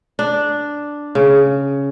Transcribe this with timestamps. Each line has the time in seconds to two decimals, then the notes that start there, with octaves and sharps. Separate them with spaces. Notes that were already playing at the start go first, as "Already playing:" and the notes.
0.19 D4
1.15 C#3